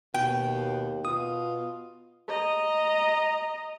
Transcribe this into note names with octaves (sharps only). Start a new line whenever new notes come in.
D#2 B2 G5
B2 F4 D#6
D#5 A#5